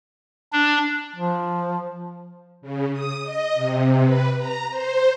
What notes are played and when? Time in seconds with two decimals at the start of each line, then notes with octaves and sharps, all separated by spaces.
0.52 D4
1.16 F3
2.62 C#3
2.92 D#6
3.23 D#5
3.55 C3
4.03 B4
4.38 A#5
4.70 C5